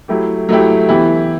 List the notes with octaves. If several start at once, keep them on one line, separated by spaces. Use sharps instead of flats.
F#3 A3 E4 G4
F#3 A3 E4 G4
E3 B3 E4 G4